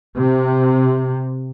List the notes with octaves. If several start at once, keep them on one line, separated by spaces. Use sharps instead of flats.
C3